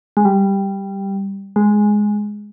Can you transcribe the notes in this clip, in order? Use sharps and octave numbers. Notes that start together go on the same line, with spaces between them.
G#3
G3
G#3